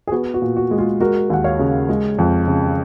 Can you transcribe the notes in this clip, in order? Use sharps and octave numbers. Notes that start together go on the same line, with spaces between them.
G#4
B3 F#4
F#4
A#2
F#4
G#3
F4 G#4
G#3 F#4 A#4
D#2 F#5
C#5 F5
C#3
G#3
F2
C#3